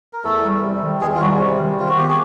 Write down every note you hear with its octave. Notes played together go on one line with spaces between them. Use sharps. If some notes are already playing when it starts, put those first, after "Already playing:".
A#4
E2 A3 A4
G3
C3
D#3
E2 G#3 G#4
F4
F#3 G3 F#4
C3
D#3
C3 F4
F#4
B3 G4
G#4